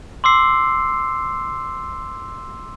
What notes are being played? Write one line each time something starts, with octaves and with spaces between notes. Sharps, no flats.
C6 D6 E6 C7